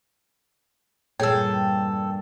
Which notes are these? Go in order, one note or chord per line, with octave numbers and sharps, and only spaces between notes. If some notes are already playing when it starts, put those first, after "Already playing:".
E2 G2 A#2 G#4 A4 C#5 G5 G#5